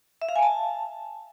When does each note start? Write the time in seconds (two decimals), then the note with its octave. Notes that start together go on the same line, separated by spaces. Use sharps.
0.22 E5
0.29 F5
0.36 G#5
0.43 A5